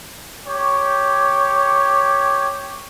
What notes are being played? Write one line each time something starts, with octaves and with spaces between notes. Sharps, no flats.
G4 C#5